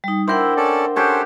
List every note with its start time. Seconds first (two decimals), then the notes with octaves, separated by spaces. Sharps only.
0.04 G3 D#4
0.28 D4 E4 A#4 C5 E5 F#5 G5
0.57 C#4 A4 D5
0.96 C#4 F#4 G4 A4 C5 C#5